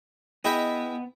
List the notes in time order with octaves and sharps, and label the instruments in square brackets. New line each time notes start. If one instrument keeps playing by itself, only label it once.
[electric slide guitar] B3 [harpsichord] E4 G#4 E5 [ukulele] D#5 [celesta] G5 B5 G6